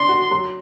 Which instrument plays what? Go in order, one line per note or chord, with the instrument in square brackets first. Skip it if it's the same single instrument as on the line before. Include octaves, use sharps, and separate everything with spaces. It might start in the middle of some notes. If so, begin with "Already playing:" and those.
Already playing: [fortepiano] D4 [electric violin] C6
[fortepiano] F#4
F#3